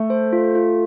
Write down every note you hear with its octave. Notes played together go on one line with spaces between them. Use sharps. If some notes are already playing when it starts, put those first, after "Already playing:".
Already playing: A3 A4
C5
F4
F4